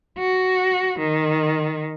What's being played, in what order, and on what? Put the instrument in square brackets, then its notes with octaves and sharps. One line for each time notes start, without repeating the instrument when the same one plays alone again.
[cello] F#4
D#3